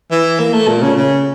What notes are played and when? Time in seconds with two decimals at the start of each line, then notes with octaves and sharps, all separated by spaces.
0.11 E3
0.39 A#3
0.53 A3
0.68 A#2
0.82 C#3
0.96 C#3